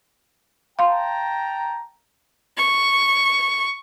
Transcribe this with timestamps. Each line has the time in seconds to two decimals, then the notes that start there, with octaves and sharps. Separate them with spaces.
0.79 F5 G5 A5 A#5 C6
2.58 C#6